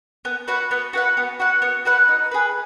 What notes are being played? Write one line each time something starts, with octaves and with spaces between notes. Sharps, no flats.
B3
F#4 B4 F#5
B3
F#4 B4 F#5
B3
F#4 B4 F#5
B3
F#4 B4 F#5
D#4
G#4 B4